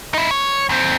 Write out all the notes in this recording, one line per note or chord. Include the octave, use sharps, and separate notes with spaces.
D#4 E4
C#5
D#2 C4